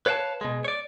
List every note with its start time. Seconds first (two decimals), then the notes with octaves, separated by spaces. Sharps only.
0.06 B4 C#5 F5 G5 A5
0.41 B2 G#3
0.64 C#5 D5